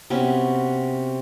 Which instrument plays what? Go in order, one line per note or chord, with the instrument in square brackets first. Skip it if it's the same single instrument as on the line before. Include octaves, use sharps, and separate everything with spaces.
[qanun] C3 B3 C#4 F#4